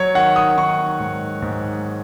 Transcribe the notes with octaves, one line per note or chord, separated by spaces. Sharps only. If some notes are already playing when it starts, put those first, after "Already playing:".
Already playing: F#3 C#5
D#3 F#5
D#6
D#3 C#6
G#2
G#2